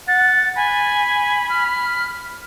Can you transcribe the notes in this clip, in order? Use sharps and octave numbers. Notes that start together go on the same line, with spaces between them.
F#5 A6
G#5 B5
F6